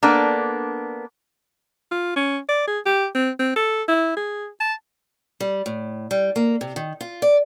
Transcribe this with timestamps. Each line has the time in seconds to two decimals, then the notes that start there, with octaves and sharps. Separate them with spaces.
0.03 A#3 B3 D4 A4
1.91 F4
2.16 C#4
2.49 D5
2.67 G#4
2.86 G4
3.15 C4
3.39 C4
3.56 A4
3.88 E4
4.17 G#4
4.61 A5
5.40 G3
5.66 A2
6.11 G3
6.36 A#3
6.61 C3
6.76 D#3
7.01 F4
7.22 D5